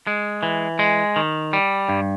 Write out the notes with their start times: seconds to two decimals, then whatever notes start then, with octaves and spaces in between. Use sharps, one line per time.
0.07 G#3
0.43 E3
0.79 G#3
1.16 D#3
1.53 G3
1.89 G2